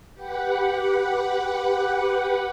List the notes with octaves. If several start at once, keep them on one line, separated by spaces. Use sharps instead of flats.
G4 B4 F#5